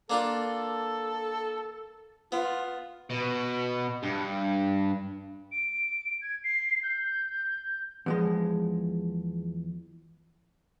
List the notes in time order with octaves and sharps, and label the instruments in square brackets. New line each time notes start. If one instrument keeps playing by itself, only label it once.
[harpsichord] A#3 D4 F4 [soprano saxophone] A4
[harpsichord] B3 [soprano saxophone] F4
[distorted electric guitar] B2
G2
[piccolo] D7
G#6
C7
G6
[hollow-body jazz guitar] E2 F3 G#3